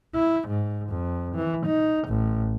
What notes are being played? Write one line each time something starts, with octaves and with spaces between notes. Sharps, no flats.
E4
G#2
F2
E3
D#4
A1